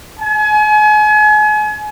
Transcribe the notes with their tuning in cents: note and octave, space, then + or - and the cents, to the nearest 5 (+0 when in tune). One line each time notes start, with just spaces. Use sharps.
G#5 +35